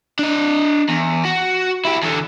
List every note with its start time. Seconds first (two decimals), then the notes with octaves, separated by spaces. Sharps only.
0.19 D4 D#5
0.89 E2
1.25 F#4
1.85 E4 G4
2.02 E2 D3